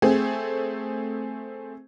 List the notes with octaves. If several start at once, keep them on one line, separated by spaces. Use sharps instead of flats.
A3 C4 G#4